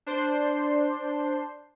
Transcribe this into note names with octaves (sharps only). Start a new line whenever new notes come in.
D4 C5 C6